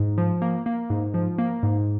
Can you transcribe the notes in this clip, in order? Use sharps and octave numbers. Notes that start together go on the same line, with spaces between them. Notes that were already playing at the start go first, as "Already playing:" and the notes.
Already playing: G#2
F3
A#3
A#3
G#2
F3
A#3
G#2